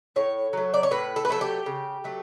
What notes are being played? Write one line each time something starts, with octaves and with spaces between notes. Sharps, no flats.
A2 C#5
F#3 A3
D5
C#5
A2 B4
A4
B4
F#3 A3 A4
G4
C#3
F#3 A3